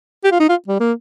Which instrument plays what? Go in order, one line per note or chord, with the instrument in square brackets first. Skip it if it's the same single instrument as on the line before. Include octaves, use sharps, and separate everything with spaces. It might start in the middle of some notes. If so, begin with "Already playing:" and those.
[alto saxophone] G4
F4
D#4
F4
G3
A#3